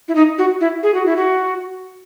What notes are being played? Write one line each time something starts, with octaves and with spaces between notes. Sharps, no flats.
E4
D#4
F#4
E4
G#4
F#4
E4
F#4